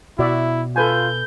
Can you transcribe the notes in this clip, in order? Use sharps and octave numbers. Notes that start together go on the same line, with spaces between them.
B2 E4 F#4 D5 E5
F4 A4 B4 G#5 G6